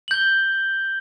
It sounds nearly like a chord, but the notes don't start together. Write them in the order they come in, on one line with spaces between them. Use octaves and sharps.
F#7 G6 G7